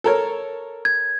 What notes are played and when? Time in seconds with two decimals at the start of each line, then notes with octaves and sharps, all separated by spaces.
0.04 A4 A#4 C#5
0.85 G#6